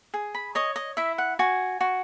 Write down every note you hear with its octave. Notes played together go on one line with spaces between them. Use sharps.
G#4
B5
C#5 D#5
D#5
E4 E5
F#5
F#4 G#5
F#4